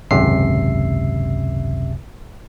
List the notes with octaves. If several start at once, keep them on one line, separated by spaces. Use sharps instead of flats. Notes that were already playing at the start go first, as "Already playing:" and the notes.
G#1 C#2 F#2 C3 E5 C7